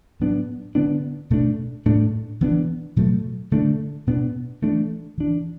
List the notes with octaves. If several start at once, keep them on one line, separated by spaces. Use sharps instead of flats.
A2 F#3 B3 D4
D3 B3 D4
B2 A3 D4
A2 A3 D4
E3 B3 D4
B2 F#3 A3
D3 A3 D4
B2 B3 D4
E3 A3 D4
E3 D4